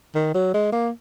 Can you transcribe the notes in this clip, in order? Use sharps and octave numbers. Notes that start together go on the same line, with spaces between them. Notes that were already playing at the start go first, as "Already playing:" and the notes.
D#3
F#3
G#3
A#3